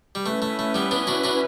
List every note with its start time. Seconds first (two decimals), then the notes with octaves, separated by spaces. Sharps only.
0.15 G3
0.26 A3 C#4 E4 B4
0.42 A3
0.59 A3
0.74 G3 B3
0.91 B3 D4
1.07 D4 F#4
1.24 D4 F#4